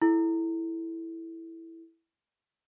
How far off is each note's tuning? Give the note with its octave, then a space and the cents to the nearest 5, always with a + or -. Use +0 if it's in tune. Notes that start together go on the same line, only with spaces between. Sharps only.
E4 +0 A4 -20